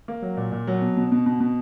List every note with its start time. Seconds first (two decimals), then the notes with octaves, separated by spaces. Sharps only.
0.08 A#3
0.22 F#3
0.37 A#2
0.52 A#2
0.67 F#3
0.81 B2
0.97 B2
1.12 B2
1.26 B2
1.40 B2